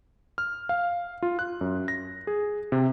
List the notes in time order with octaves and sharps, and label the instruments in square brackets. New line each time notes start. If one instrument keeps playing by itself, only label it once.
[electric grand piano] F6
F5
F4
F#6
F#2
A#6
G#4
C3